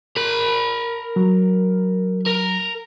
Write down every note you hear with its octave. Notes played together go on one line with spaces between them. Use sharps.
A#4 B5
F#3
A#4